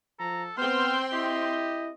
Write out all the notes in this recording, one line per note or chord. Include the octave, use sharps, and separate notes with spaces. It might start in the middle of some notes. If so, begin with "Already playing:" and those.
F3 A4 A#5
B3 C4 C5 G5 C6 F6
E4 G4 D#5